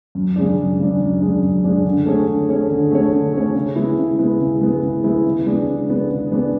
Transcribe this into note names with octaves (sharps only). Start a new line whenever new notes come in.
F#2
C#3 G#3 D4
F#2
C#3 G#3 D4
F#2
C#3 G#3 D4
F#2
C#3 G#3 D4
D3
A3 C#4 G#4 C#5
D3
A3 C#4 G#4 C#5
D3
A3 C#4 G#4 C#5
D3
A3 C#4 G#4 C#5
C#3
G#3 B3 E4
C#3
G#3 B3 E4
C#3
G#3 B3 E4
C#3
G#3 B3 E4
C#3
G#3 B3 D4
C#3
G#3 B3 D4
C#3
G#3 B3 D4